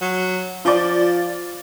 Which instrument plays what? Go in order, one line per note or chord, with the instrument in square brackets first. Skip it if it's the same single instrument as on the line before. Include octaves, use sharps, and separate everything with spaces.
[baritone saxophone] F#3
[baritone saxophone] F3 [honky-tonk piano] F4 D5